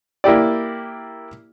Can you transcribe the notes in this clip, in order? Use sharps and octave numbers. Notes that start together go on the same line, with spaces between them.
A#3 E4 G4 D5